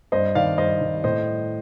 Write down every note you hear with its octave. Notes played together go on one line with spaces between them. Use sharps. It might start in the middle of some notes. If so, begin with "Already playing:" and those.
G2 C5 D#5
D#3 D5 F5
G2 C5 D#5
D#3
A2 C5 D#5